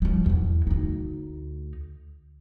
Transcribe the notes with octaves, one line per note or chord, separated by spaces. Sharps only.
F3 G3
E2 E3
D2 D#4